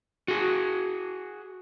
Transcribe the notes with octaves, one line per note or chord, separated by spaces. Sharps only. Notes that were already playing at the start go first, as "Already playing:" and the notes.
F#4 G#4